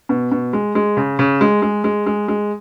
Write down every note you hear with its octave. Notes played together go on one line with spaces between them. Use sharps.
B2
B2
G#3
G#3
C#3
C#3
G#3
G#3
G#3
G#3
G#3